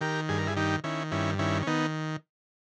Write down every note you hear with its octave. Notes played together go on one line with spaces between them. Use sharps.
D#3 G4 A#4
G2 G#4
A#4
E4 G#4
D#3 D#4 G4
D#3 C#4 E4
G2 C#4 E4
D#3 C#4 E4
C#4
D#3 B3 D#4